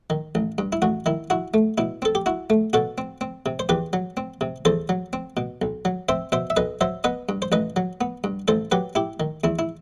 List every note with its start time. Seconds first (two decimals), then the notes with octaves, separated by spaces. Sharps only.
0.10 D#3
0.35 A1
0.58 G2
0.72 E4
0.82 A1 F#4
1.06 D#3 E4
1.30 E4 F#4
1.54 A3
1.78 B2 E4
2.02 C4 A4
2.15 G4
2.26 E4 F#4
2.50 A3
2.73 B2 F#4 A4
2.98 C4
3.21 C4
3.46 C3
3.59 C5
3.69 E2 G4 B4
3.93 F#3
4.17 C4
4.41 C3
4.65 E2 A4 C5
4.89 F#3
5.13 C4
5.37 B2
5.62 B1
5.85 F#3
6.09 C4 C5 E5
6.32 B2 C5 E5
6.50 E5
6.57 B1 B4 D#5
6.81 F#3 C5 E5
7.04 B3 B4 D#5
7.29 G2
7.42 C5
7.52 A1 B4 D#5
7.76 F#3
8.01 B3
8.24 G2
8.48 A1 A4 C5
8.72 F#3 G4 B4
8.95 E4 G4
9.20 D#3
9.44 E2 E4
9.59 E4